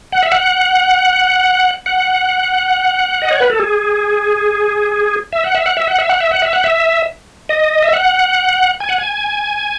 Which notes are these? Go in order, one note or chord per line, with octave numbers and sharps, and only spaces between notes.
F#5
E5
F#5
F#5
D#5
C#5
B4
A4
G#4
E5
F#5
E5
F#5
E5
F#5
E5
F#5
E5
F#5
E5
F#5
E5
D#5
E5
F#5
G#5
F#5
G#5